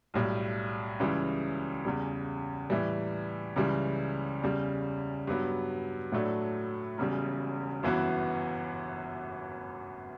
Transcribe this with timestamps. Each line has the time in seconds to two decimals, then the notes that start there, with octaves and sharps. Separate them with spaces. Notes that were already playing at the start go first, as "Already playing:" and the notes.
0.14 B1 A2 G3
1.00 C#2 C#3 E3 G3
1.85 E2 C#3 G3
2.70 A2 E3 G3
3.56 C#2 C#3 E3 G3
4.42 E2 C#3 G3
5.27 G2 F#3 B3
6.12 A2 F#3 A3 D4
6.98 E1 E2 C#3 G3
7.83 G1 F#2 E3 B3 F#4